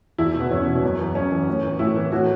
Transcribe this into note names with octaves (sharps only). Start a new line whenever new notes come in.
E2 E4
B2
B3
E2 C#4
B2
F#2
E3
F#2 C#4
E3
A2
E3
A2 E4
E3
A2 F#4